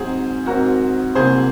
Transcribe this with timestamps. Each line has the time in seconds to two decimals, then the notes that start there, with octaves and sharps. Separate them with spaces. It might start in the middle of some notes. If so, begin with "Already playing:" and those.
Already playing: G#2 F#3 C4 G#4 C5
0.46 G#2 F#3 C4 F#4 A#4
1.15 C2 C3 F#3 A#3 G#4 C5